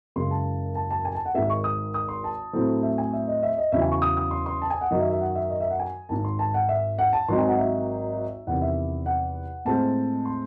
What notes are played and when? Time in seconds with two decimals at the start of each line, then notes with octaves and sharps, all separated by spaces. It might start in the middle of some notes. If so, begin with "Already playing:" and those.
0.16 F#1 F#2 C#3 G#3 C6
0.31 A5
0.75 A5
0.91 A5
1.05 G#5
1.15 A5
1.25 F#5
1.34 G#1 G#2 D#3 G#3 E5
1.50 C#6
1.64 D#6
1.94 D#6
2.09 C6
2.24 A5
2.53 A2 F#3 A3 C4 E4
2.83 E5
2.98 G#5
3.13 E5
3.28 D#5
3.43 E5
3.58 D#5
3.72 E2 C#3 F#3 C#4 E4 E5
3.81 G#5
3.91 C#6
4.02 D#6
4.17 D#6
4.31 C6
4.46 C6
4.62 A5
4.70 G#5
4.81 F#5
4.91 F#2 D#3 F#3 D#5
5.00 E5
5.11 E5
5.21 F#5
5.35 E5
5.50 D#5
5.61 E5
5.70 F#5
5.80 G#5
6.09 G#1 G#2 D#3 A5
6.24 C6
6.39 A5
6.54 F#5
6.69 E5
6.99 F#5
7.13 A5
7.28 G#1 G#2 F#3 C4 D#4 C6
7.38 G#5
7.48 F#5
7.58 E5
8.47 E2 C3 D#3 F#5
8.62 E5
9.06 F#5
9.65 A2 G#3 C4 A5
10.25 C6